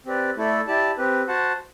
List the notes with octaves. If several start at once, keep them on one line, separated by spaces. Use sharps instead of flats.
C4 G4 B4 D5
A3 E4 A4 D5
E4 G4 D5 A5
C4 G4 B4
F#4 C5 F#5 A5